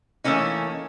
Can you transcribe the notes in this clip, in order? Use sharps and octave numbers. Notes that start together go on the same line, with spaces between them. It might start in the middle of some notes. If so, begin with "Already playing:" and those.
E3 A3 A#3 C#4 D#4